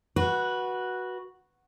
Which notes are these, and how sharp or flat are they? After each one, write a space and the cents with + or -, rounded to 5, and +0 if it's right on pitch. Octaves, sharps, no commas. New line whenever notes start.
F#4 +0 B4 -20